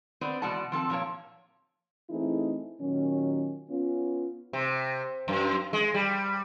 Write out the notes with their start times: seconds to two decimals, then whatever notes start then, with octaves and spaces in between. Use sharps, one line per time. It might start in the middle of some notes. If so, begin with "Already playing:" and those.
0.21 B3 C4 C5 D5
0.42 E2 B2 G#3 D5 F#5 A5
0.72 F3 C4 A4 A5
0.89 A#2 F3 A#3 C#5 A5
2.10 E3 A3 C4 D#4 E4 G#4
2.81 A#2 D#3 F#3 C#4
3.69 B3 C#4 F4
4.53 C3
5.28 F#2
5.73 G#3
5.94 G3